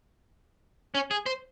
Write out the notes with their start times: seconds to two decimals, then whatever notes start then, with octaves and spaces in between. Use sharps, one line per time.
0.95 C#4
1.11 G#4
1.26 C5